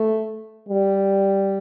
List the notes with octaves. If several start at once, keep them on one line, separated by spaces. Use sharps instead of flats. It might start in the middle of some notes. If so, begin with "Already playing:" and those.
Already playing: A3
G3